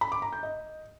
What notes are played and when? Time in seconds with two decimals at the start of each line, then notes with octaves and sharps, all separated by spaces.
0.01 B5
0.12 D6
0.22 A#5
0.33 G6
0.43 D#5